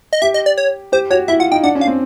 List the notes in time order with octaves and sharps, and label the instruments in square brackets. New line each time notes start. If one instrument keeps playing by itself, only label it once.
[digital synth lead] D#5
[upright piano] G4 [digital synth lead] E5
[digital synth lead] D#5
D5
C#5
[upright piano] G4 [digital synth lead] C5
[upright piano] F#4 [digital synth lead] C#5
[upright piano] E4 [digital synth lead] E5
[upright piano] F4 [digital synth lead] F#5
[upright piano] D#4 [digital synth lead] G5
[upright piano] D4 [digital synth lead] F#5
[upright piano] C#4
[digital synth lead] F5
[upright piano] C4